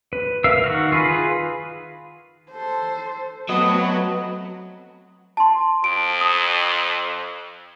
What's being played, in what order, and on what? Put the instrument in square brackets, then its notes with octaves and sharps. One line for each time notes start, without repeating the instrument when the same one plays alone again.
[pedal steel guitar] B4
A#4 E5 F5 E6
D#3 F#4 F6
F4 G#4 B4
[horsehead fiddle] A4 C5
[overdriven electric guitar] F#3 [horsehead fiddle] A3 C4 [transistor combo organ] B3 F#4 [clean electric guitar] D#5
[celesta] A5 C6
[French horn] F2 [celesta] D7
[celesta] D#6